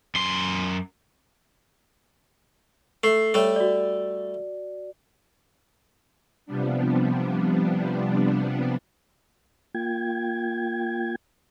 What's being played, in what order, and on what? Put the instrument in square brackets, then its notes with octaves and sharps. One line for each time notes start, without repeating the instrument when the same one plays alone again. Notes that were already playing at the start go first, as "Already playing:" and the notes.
[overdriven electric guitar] F#2 C6
[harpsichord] A3 [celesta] C7
[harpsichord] G3 A3 [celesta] C#5
[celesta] F#4 D5
[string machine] C3 F3 G3 B3 D4
[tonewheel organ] A#3 F4 G5 G#6